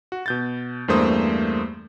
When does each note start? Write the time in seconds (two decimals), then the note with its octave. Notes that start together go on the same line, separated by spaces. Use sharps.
0.12 F#4
0.26 B2 G6 A6
0.88 E2 G2 A3 A#3 C5 D#6